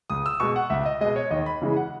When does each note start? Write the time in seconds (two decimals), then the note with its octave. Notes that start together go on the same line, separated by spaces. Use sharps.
0.10 C#2 D#6
0.26 E6
0.40 B2 G#3 C#6
0.56 F#5
0.70 C#2 E5
0.86 D#5
1.01 B2 G#3 D#5
1.16 C#5
1.31 D#2 D#5
1.46 B5
1.62 C#3 E3 G#3
1.77 F#5